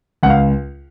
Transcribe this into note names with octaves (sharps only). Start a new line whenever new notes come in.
C#2 F#5
F5